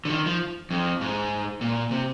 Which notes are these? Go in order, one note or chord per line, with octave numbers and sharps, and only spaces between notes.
D3
D#3
F3
F2
G#2
A#2
C3